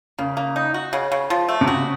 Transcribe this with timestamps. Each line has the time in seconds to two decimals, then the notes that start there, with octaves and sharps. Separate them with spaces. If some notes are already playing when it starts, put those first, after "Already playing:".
0.19 C#3 A#3
0.37 A#3
0.56 D#4
0.74 F#4
0.93 C#3
1.12 C#3
1.30 F3
1.49 A3
1.61 C3
1.67 C#3 F#4